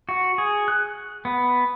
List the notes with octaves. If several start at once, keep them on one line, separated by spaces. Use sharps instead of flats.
F#4
G#4
F#6
B3